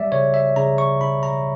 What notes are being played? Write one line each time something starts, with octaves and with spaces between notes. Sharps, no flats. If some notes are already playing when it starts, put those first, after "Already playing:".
Already playing: G3 D5 E5
C#3 C#5
E5
C#3 A#5
C#6
C#3 B5
A#5